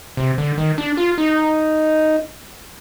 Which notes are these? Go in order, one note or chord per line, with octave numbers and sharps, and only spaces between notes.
C3
D3
D#3
D4
F4
D#4